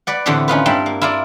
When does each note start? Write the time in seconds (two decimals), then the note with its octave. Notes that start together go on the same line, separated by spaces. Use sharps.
0.07 B4 D5 F#5
0.26 A2 D3 E3 B3 C4 G4
0.48 C#4 D#4 F4 B4
0.66 G2 G3 E4 G5 C6
0.86 A#3
1.02 E4 F4 A#4 D5